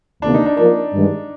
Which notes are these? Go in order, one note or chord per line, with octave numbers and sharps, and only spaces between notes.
D2 C3 D#3 A#3 D4
D#4
D4
F3 A#3 D4 F4 A#4
G2 D#3 G#3